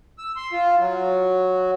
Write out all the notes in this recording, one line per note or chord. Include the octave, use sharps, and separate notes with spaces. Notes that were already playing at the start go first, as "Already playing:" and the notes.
E6
C6
F4
F#3